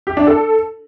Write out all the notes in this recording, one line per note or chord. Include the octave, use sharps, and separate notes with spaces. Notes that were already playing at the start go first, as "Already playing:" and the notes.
G4
D4
A4